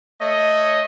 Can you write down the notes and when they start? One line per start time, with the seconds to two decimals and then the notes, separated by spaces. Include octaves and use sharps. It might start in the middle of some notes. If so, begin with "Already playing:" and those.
0.22 A3 C#5 D#5